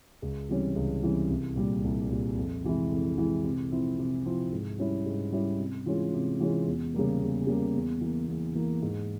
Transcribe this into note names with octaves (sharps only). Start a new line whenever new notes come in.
C#2
C3 E3 G3 C#4
C#2
C3 E3 G3 C#4
C2
A#2 G3
C2
A#2 G3
F2
C3 E3 G#3 E4
F2
C3 E3 G#3 E4
C3
F3 C4 E4
C3
F3 C4 E4
G#2
G3 C#4 E4
G#2
G3 C#4 E4
C3
E3 G#3 C#4 F4
C3
E3 G#3 C#4 F4
E2
C#3 G3 A#3
E2
C#3 G3 A#3
E2
E3 A#3
E2
E3 A#3
G#2